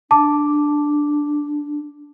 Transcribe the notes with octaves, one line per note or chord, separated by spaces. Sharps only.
D4 A5 D6